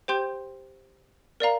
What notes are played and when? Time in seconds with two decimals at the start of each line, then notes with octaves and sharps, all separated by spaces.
0.08 G4 C5 G5 C6 G6
1.40 A#4 D5 F5 A#5